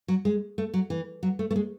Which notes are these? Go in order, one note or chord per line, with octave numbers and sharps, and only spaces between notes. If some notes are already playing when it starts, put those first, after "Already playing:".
F#3
G#3
A3
F#3
E3
F#3
A3
A3
G#3